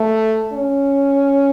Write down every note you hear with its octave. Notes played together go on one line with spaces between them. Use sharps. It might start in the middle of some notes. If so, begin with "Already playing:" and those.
Already playing: A3
C#4